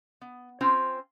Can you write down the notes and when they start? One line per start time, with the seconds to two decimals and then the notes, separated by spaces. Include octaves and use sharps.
0.21 B3
0.61 C4 C#4 F4 C5 G5